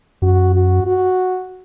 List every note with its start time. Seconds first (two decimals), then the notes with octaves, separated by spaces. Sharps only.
0.22 F#2 F#4
0.55 F#4
0.86 F#4